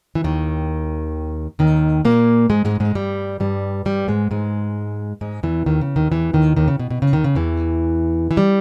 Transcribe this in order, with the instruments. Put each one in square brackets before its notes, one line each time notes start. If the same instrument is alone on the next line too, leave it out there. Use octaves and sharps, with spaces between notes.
[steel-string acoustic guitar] E3
D#2 D#3
D#2 D#3
A#2 A#3
G#2 G#3
G#2 G#3
G#2 G#3
G2 G3
G2 G3
G2 G3
G#2 G#3
G#2 G#3
G#2 G#3
E2 E3
D#2 D#3
C#3
D#2 D#3
E2 E3
D#2 D#3
D#2 D#3
C#3
B2
B2
C#3
D#2 D#3
C#3
E2 E3
E3
G3